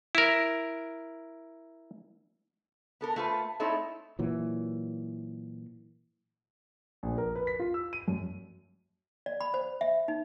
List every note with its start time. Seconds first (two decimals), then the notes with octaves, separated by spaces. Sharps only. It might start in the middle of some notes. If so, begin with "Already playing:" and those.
0.15 E4 A#4
3.01 B3 A4 A#4
3.16 A3 F4 B4 C5
3.60 A3 C4 D#4 E4 A4 C#5
4.19 A#2 E3 F#3
7.03 A#1
7.18 A#4
7.36 B4
7.47 B6
7.60 F4
7.74 E6
7.93 D#7
8.08 F#2
9.26 D5
9.41 B5
9.54 C5
9.81 E5
10.08 D#4